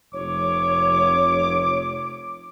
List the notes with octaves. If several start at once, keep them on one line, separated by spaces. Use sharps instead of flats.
F1 C#5 D6